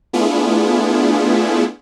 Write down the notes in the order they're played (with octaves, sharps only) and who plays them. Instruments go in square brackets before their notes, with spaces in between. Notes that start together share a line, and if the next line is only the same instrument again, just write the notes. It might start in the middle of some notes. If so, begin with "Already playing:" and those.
[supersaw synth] A3 B3 D4 E4 F4 G#4